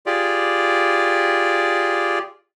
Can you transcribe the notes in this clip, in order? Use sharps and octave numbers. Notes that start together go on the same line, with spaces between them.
F4 G4 G#4 D5